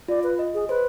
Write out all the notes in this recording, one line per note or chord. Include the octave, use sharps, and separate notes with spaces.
F4 D5
B4
D#5
G#4
B4 C5